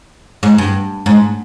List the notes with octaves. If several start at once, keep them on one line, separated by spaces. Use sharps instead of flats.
G#2
G2
G#2